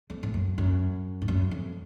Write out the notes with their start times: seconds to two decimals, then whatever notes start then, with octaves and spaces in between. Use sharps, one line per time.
0.10 F2
0.23 A2
0.34 F#2
0.58 F#2
1.22 A2
1.28 F#2
1.51 F2